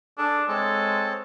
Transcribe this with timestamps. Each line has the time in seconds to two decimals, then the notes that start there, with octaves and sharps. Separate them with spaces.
0.18 D4 G#4 A4
0.48 G#3 C4 A4 C#5